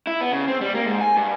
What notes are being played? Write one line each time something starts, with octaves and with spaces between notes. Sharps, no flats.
E4
B3
C#3
C4
G3
A#3
G#2
G#5
G2